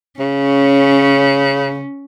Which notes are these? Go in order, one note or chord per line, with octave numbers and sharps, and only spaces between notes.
C#3 C#4